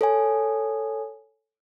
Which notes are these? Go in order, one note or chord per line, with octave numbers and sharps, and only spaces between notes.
A4 C#5 G#5